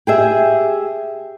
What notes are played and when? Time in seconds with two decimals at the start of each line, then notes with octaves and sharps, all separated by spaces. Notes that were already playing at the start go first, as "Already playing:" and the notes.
0.07 G4 G#4 E5